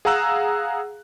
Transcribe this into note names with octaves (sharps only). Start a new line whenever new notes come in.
G#4 F5 F#5 A#5 E6 F#6